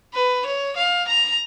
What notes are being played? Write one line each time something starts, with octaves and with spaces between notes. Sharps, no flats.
B4
C#5
F5
A#5